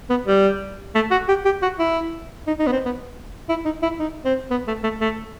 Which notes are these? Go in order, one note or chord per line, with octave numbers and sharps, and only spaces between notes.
B3
G3
A3
F#4
G4
G4
F#4
E4
D#4
D#4
B3
C4
B3
E4
D#4
E4
D#4
C4
B3
A3
A3
A3